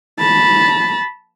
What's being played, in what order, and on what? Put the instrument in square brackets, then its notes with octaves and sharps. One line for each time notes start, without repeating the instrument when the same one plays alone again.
[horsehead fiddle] A5 B5